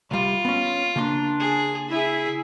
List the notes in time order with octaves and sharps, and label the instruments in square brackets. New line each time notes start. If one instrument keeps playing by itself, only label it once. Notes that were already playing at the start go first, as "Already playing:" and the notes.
[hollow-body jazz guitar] C2 G3 [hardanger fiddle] F4
[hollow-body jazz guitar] B3 C#4
[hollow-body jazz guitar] C#3 A#3 C6 [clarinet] D4
[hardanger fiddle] G#4
[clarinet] E4 [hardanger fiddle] G#4 E5